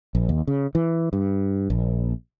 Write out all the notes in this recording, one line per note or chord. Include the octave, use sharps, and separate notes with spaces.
A#1
D#2
C#3
E3
G2
A#1